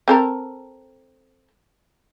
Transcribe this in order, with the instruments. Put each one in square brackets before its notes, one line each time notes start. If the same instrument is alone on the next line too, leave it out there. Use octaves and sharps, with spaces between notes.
[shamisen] C4 A4 A#4